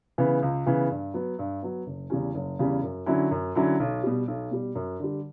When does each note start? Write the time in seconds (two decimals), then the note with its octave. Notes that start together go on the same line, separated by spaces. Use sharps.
0.18 C#3 E3 B3
0.42 C#2
0.66 C#3 E3 B3
0.91 G2
1.14 F#3 B3
1.39 G2
1.63 F#3 B3
1.86 F#1
2.10 E2 C#3 G3 C#4
2.35 F#1
2.59 E2 C#3 G3 C#4
2.83 F#2
3.06 D3 F#3 C#4 E4
3.31 F#2
3.55 D3 F#3 C#4 E4
3.79 B1
4.03 B2 G3
4.28 B1
4.51 B2 G3
4.75 F#2
4.99 D3 G3